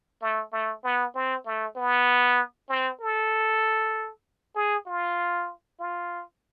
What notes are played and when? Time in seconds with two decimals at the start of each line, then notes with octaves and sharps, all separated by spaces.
0.21 A3
0.52 A3
0.84 B3
1.15 C4
1.45 A3
1.76 B3
2.69 C4
3.01 A4
4.55 G#4
4.87 F4
5.79 F4